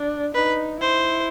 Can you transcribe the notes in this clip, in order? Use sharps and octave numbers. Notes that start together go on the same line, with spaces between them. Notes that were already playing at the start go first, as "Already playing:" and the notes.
Already playing: D4
D#4 B4
E4 C5